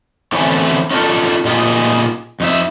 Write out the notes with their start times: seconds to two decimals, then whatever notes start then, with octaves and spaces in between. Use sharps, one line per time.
0.32 D3 E3 A3 C4 C#4 E4
0.91 C#4 D#4 F4 A4 D5
1.45 A#2 D#4 F4 G4 G#4
2.40 F2 D#4 E5